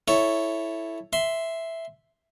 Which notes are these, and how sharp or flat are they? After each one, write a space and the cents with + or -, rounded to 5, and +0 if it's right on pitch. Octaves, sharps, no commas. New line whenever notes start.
E4 +0 A4 +0 C#5 +0
E5 +0 C6 -5